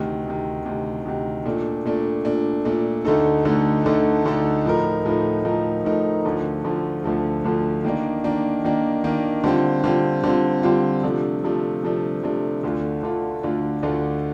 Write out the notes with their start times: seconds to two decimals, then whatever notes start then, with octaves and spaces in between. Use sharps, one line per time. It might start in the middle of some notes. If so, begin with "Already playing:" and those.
Already playing: D2 C3 D#3
0.26 D2 C3 D#3
0.65 D2 C3 D#3
1.05 D2 C3 D#3
1.45 A#2 A3 D4
1.85 A#2 A3 D4
2.25 A#2 A3 D4
2.65 A#2 A3 D4
3.05 D2 D3 A3 D#4 A4
3.45 D2 D3 A3 D#4 A4
3.85 D2 D3 A3 D#4 A4
4.25 D2 D3 A3 D#4 A4
4.65 A2 F3 A3 D#4 A#4
5.05 A2 F3 A3 D#4 A#4
5.45 A2 F3 A3 D#4 A#4
5.84 A2 F3 A3 D#4 A#4
6.25 D2 D3 F3 A3
6.64 D2 D3 F3 A3
7.04 D2 D3 F3 A3
7.44 D2 D3 F3 A3
7.84 D#3 A#3 D4
8.24 D#3 A#3 D4
8.64 D#3 A#3 D4
9.04 D#3 A#3 D4
9.44 D3 G3 C4 F4
9.84 D3 G3 C4 F4
10.24 D3 G3 C4 F4
10.63 D3 G3 C4 F4
11.03 C3 F3 A3 D4
11.43 C3 F3 A3 D4
11.83 C3 F3 A3 D4
12.23 C3 F3 A3 D4
12.63 D2 D3 A3 D4 F4
13.03 D2 D3 A3 D4 F4
13.43 D2 D3 A3 D4 F4
13.83 D2 D3 A3 D4 F4